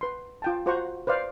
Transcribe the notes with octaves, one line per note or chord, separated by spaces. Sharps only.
B4 C6
F4 G5 A5
F4 F#4 C5 F#5 A#5 C#6
B4 C5 D5 F5